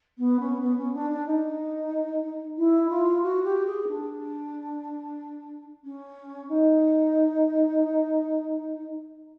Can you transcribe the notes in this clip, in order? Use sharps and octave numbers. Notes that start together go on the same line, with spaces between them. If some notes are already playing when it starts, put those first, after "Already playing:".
B3
C#4
B3
C#4
D4
D4
D#4
E4
F4
F#4
G4
G#4
D4
C#4
D#4